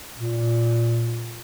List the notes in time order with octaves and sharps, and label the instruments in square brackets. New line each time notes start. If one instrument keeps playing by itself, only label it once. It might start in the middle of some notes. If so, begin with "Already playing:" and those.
[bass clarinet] A#2